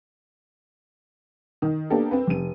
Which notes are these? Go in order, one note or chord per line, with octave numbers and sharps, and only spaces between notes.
D#3
A#3 B3 D4 G4 A4
C4 B4
F1 D#7